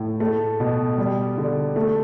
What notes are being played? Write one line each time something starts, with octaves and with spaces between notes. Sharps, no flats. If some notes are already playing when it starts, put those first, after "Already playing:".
Already playing: A2
A3
B2
G3
D3
A3